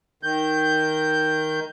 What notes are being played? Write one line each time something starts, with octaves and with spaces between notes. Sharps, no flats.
D#3 G6